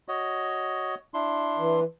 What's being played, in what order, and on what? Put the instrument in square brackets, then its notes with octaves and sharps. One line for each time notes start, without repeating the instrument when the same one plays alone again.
[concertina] F#4 C#5 D#5
D4 E4 C6
[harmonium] E3